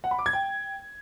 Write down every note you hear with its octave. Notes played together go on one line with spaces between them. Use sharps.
F#5
B5
D6
G#6
G5